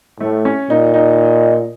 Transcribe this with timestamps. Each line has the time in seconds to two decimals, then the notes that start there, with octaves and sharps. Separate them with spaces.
0.20 A2 A3
0.45 C#4
0.70 A#2 D#4
0.94 D#4